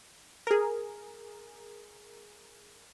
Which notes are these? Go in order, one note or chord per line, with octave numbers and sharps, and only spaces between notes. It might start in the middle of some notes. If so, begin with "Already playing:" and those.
G#4 A#4